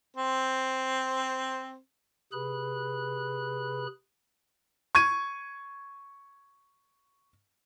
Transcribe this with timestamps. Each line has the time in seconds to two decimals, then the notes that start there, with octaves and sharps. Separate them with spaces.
0.17 C4 C5
2.32 C3 G#4 B4 B5 F#6
4.95 C#6 G#6 D#7